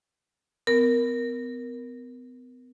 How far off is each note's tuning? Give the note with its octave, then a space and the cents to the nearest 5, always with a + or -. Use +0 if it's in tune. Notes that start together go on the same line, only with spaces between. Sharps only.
B3 +40 A#4 +5